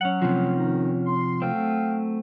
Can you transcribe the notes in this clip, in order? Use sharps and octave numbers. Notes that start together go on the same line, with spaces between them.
F#3 C#4 F#5
C3 F3
D#3 D#4
C6
F#3 A3 C4 F5 G5